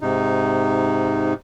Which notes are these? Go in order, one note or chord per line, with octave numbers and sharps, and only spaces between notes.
G#2 C3 D#4